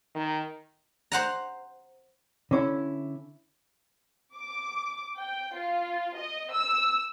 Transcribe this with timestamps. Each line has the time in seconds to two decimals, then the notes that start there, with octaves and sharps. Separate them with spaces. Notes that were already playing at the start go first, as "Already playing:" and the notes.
0.15 D#3
1.12 C5 F#5 A#5
2.51 D3 C#4 E4
4.36 D6
5.18 G5
5.55 F4
6.18 D#5
6.53 E6